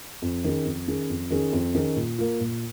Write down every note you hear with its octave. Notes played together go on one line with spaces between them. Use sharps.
F2
D#3 C#4 G#4
F2
D#3 C#4 G#4
F2
D#3 C#4 G#4
F2
D#3 C#4 G#4
A#2
A#3 F4
A#2